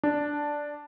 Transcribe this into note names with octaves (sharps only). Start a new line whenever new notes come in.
D4